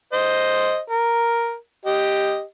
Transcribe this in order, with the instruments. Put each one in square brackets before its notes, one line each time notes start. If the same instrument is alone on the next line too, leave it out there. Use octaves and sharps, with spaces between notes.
[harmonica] C5 D#5
A#4
G4 D#5